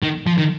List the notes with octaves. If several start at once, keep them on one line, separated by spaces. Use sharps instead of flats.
D#3
F3
D#3